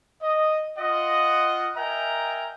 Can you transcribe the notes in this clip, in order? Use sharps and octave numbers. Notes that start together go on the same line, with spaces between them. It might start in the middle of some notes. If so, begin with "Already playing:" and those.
D#5
F4 D#5 F#5
A#4 D#5 E5 G5 G#5 A#5